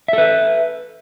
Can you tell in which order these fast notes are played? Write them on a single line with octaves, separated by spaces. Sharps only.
E5 A4 B4